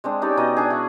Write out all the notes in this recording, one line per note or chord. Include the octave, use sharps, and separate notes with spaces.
G#3 C4 D4
C#4 D#4 G4 D5
B2 D#4 D#5
D4 G#4
E4 F#4